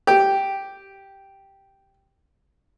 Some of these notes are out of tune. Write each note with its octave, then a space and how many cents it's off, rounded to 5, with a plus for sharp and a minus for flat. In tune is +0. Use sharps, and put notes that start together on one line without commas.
G4 -5